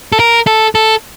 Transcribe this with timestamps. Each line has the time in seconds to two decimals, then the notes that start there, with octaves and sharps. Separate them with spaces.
0.12 A4
0.19 A#4
0.47 A4
0.75 A4